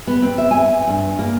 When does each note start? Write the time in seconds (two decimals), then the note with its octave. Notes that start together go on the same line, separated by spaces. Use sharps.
0.07 B3
0.22 C4
0.38 E5
0.51 G#5
0.87 G2
1.19 A#3